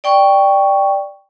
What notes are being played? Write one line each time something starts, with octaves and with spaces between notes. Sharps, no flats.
D5 G5 C#6